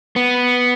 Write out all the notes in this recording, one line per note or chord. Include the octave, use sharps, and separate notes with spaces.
B3